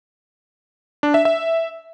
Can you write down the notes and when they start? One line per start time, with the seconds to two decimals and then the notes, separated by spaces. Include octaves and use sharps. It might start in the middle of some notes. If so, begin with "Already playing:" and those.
1.03 D4
1.14 E5
1.25 E5